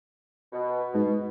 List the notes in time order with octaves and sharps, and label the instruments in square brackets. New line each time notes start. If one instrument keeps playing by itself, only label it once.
[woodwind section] B2
[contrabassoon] G#2 [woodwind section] B2